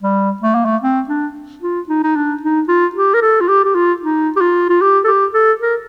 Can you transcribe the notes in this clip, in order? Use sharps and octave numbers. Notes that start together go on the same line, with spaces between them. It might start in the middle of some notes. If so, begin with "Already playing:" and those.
G3
A3
A#3
A3
C4
D4
F4
D#4
D#4
D4
D#4
F4
G4
A#4
A4
F4
G4
G4
F4
D#4
G4
F4
F4
G4
A4
G4
A4
A#4